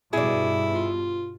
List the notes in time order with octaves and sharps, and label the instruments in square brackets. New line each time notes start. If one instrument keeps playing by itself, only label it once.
[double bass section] G2 B2 [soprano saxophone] E4 [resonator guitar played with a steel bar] G#4 D5
[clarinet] F4